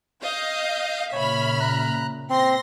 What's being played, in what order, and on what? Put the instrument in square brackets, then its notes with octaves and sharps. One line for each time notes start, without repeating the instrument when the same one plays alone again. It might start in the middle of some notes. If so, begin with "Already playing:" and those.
[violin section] D#5 F5 G6
[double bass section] A#2 C#3 [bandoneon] C#5 [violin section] E5 B5 F6
[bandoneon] A#5 F#6
[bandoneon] C4 [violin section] C6 A#6